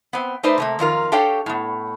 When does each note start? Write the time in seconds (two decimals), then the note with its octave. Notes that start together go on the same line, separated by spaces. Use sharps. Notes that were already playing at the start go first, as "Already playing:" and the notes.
0.13 B3 C4
0.43 A3 D#4 B4 C5 D5
0.58 C3 A3 A#3
0.79 F2 D#3 F4 A#4
1.12 D4 G4 A4 C#5 F5 G5
1.46 A2 B3